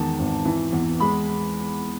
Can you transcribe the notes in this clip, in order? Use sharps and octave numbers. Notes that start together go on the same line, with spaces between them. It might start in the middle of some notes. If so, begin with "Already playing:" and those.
Already playing: E2 D#3 G#3 A5
G#1
E3
E2
G#3 B5